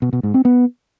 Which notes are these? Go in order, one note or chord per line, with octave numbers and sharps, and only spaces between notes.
B2
B2
G#2
C4
B3